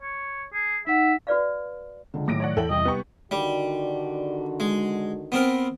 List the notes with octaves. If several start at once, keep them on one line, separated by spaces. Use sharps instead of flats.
C#5
G#4
D#4 E5 F#5
F#4 B4 D5 F5
C#2 D3
A2 D#3 F#3 D6 A#6 D7
C#5 D5 F#5
E2 E3 E4 A4 G5 F#7
C2 D#5
B3 G4 C#6
D3 D#3 G3 F#4
G#3
B3 C4 A#4